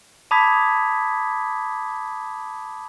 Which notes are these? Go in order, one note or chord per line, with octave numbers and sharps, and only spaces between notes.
A5 B5 D6 D#6 G#6 B6